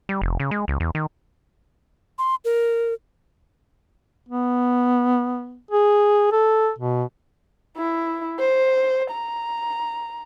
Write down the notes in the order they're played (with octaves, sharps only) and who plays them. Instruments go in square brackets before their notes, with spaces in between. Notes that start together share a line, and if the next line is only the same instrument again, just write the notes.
[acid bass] G3
F1
C#3
G#3
C#2
E2
D#3
[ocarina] C6
A#4
[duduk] B3
G#4
A4
B2
[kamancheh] E4
C5
A#5